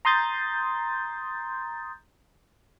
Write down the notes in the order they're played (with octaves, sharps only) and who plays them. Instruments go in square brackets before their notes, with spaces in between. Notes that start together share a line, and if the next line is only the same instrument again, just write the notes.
[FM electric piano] A#5 C6 D#6 G6 A6